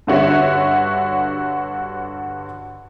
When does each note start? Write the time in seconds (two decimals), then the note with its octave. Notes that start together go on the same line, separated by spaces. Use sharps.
0.07 G2 D3 F#4 C#5 E5